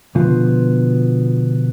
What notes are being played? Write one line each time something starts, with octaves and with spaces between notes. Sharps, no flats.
B2 D3 F3 B3 F4